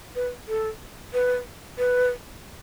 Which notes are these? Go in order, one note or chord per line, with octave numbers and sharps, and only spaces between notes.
B4
A4
B4
B4